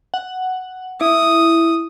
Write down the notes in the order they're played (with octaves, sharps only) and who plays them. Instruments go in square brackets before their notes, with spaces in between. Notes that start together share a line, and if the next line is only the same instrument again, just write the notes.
[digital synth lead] F#5
[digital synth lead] E4 [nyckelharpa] D#6